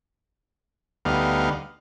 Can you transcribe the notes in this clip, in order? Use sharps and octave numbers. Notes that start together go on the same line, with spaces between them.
D2 G3 B3 D#4 F5